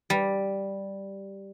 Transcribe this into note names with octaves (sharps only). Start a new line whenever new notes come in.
G3